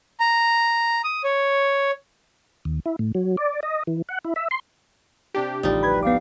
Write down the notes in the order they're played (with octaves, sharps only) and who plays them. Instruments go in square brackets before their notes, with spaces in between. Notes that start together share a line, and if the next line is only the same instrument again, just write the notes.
[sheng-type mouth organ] A#5
D#6
C#5
[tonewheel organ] D#2
E4
A2
F#3
D5
D#5
E3
F#5
E4
E5
C6
[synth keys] C3 D4 G4
[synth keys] A1 D2 F3 [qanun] G3 D#4
[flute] B4 [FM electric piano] B5 G#6
[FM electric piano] B3 D6 [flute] F5